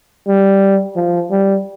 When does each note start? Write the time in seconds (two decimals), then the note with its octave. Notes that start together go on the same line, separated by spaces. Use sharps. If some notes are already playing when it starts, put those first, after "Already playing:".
0.28 G3
0.96 F3
1.31 G3